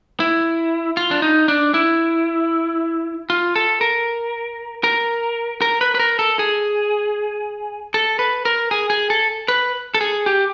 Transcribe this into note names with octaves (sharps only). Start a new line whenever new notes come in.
E4
F4
D4
D#4
D4
E4
F4
A4
A#4
A#4
A#4
B4
B4
A#4
A4
G#4
A4
B4
A#4
G#4
G#4
A4
B4
A4
G#4
G4